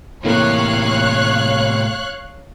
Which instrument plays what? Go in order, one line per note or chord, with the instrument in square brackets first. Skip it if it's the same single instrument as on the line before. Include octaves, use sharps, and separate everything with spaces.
[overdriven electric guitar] A2 C3 [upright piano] E3 A#3 [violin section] C#5 F5 F#6